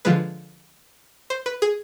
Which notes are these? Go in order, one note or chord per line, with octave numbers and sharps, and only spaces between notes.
D3 F3 G#3 B4
C5
B4
G#4